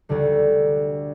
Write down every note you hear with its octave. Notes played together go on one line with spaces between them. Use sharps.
D2 D3 G3